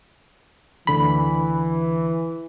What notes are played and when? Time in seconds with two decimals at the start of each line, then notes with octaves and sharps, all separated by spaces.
0.87 D2 D3 E3 B5